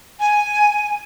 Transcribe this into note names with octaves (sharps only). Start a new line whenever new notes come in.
G#5